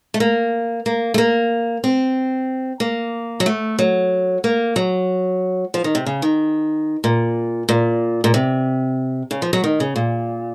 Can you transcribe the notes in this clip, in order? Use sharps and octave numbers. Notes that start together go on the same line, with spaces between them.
A3
A#3
A#3
A3
A#3
C4
A#3
F#3
A3
F#3
A#3
F#3
F3
D#3
C3
C#3
D#3
A#2
A#2
A#2
C3
C#3
F3
F#3
D#3
C#3
A#2